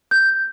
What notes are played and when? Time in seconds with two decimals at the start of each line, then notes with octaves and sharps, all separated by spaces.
0.11 G6